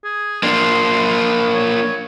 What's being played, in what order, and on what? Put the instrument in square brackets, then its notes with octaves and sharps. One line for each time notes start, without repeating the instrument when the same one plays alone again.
[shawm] G#4
[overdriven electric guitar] A#3 D4 [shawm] C6
[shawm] C#5